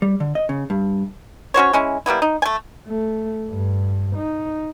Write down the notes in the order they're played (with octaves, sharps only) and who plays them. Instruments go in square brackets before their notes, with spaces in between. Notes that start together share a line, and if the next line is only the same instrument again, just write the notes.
[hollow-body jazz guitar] G3
D3
D#5
C#3
G2
[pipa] C#4 F#4 C5 C#5
G#3 C#4 E4
G3 A#3 B3 E4
D#4
A3 G#5
[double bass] A3
G2
D#4